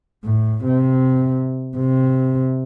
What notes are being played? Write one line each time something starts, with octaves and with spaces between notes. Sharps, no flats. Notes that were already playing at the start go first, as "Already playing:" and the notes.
A2
C3
C3